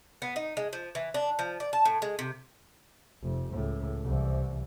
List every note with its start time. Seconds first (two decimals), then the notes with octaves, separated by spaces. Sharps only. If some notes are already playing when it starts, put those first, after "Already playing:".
0.22 B3
0.36 D#4
0.57 G#3
0.73 F3
0.95 E3
1.14 D4
1.39 F3
1.60 D5
1.73 A5
1.85 A2
2.02 G#3
2.19 C3
3.22 F1
3.52 C#2 A2
4.04 C2 E3